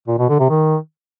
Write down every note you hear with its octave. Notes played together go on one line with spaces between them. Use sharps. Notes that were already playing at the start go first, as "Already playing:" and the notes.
A#2
B2
D3
C3
D#3